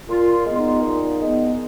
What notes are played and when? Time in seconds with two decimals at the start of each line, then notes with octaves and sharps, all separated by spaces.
0.08 A#2 F4
0.32 F4
0.45 G#3 B3
0.57 D#4
0.82 A#2
1.17 G#3 B3